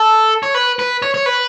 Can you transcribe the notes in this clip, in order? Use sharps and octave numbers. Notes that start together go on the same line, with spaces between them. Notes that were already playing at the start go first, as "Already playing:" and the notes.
Already playing: A4
C#5
B4
B4
C#5
C#5
B4